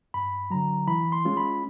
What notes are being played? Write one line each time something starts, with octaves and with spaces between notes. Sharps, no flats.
G2 B5
D3 F#3 A#5
E3 B5
C6
G#3 C#4 F4
B5